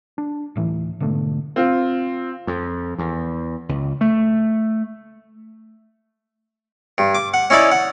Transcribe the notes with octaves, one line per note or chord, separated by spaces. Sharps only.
D4
D1 A2 E3
G#2 B2 D3 A3
C4 F4
F2
E2
C#2
A3
G2
D6
F#5
C#4 D#4 E4 D5 B5
F#5